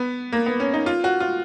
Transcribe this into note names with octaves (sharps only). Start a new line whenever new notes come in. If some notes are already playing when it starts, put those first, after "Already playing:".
Already playing: B3
A#3
B3
C#4
D#4
F4
F#4
F4